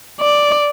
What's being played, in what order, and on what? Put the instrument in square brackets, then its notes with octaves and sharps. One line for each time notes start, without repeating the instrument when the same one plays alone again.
[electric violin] D5